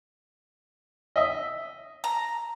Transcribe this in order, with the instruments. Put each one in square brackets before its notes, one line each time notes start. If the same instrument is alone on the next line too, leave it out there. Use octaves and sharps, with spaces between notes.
[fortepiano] D#5 E5
[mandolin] A#5